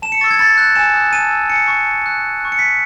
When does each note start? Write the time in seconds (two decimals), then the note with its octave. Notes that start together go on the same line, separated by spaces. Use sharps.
0.02 A5 E7
0.12 C#7
0.21 C#6 A6
0.24 E6
0.31 G#6
0.39 B5 A6
0.58 F#6
0.75 G#5 E7
0.94 D#6 F#6
1.12 A5 D#7
1.31 E6
1.49 G#5 C#7
1.67 C#6 F#6
1.86 A5
2.04 D#6 F#6
2.22 G#5
2.40 C#6 F#6
2.52 C#7
2.58 B5 B6